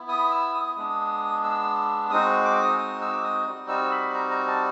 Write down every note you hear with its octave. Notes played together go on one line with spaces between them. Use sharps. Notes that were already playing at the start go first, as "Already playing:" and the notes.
Already playing: B3 E4
D#6
E6
D#6
G#3 B3 D4 D#6
E6
G#3 C4 D#4 F#4 D#6
D6
D#6
D#6
E6
D6
D#6
G3 C4 D#4 F#4 D#6
E6
B5
A#5
A#5
A5